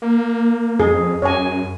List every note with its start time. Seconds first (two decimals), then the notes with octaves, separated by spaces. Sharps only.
0.02 A#3
0.80 F2 G#4
1.22 F#2 C#5 G#5